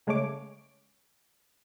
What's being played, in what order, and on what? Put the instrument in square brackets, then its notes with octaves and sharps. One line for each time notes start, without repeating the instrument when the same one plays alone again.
[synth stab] C#3 G#3 A3 C#5 D6